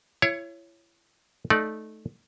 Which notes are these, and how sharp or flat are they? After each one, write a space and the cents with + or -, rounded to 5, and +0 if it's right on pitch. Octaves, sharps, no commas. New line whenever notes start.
E4 +35 C#5 +0
A3 -15 D#4 +0 D5 +0